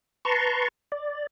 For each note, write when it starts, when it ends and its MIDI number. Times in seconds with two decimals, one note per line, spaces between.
0.25 0.68 71
0.25 0.68 81
0.25 0.68 82
0.25 0.68 84
0.25 0.68 85
0.92 1.27 74